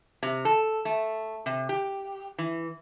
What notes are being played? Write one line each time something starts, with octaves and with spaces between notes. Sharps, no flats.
C3
A4
A3
C3
G4
E3